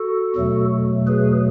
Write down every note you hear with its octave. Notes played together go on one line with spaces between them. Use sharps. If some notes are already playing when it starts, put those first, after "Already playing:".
Already playing: F#4 A4
E2 B2 F#3 A3
G#4 B4